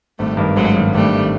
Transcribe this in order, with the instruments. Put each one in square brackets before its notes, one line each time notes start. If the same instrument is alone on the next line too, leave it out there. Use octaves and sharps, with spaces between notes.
[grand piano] G#1 [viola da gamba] G3 A3
[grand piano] G2 D#3
[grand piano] G#1 [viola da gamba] F#3 G#3
[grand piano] G2 D#3
[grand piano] G#1 [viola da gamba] G3 A3
[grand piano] D#3